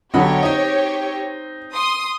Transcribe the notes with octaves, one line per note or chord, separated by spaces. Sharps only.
B1 D3 F#3 G4 C#5 D#5 F#5 B5
C4 D#4 D#5
C6 D#6